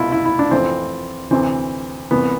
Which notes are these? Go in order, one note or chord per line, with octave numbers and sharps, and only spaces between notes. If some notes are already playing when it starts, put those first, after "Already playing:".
Already playing: C2 B2 E4 F4
E4
E4
D4
F2 C3 E3 C4
D2 C3 E3 C4
C2 C3 E3 B3